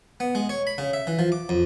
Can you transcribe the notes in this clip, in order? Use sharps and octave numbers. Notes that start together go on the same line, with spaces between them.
B3
G#3
C#5
B5
C#3
E5
E3
F3
D6
F2